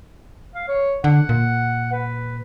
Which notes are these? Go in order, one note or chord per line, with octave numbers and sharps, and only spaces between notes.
F5
C#5
D3 F#5
A#2
B4